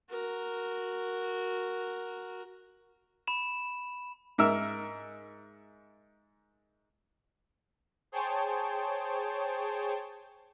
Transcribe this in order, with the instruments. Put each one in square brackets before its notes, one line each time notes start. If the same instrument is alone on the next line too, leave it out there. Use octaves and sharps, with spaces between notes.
[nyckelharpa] F#4 A#4
[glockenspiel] B5 E7
[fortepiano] G#2 A#4 E5 E6 F6
[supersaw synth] G#4 C5 C#5 G5 A5